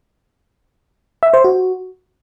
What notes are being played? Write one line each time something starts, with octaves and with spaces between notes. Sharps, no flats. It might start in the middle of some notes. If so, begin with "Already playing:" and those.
E5
C5
F#4